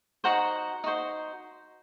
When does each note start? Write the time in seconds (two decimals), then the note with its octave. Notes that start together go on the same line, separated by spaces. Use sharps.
0.24 D#4 F#4 C5 F#5 A#5
0.84 D#4 F#4 C5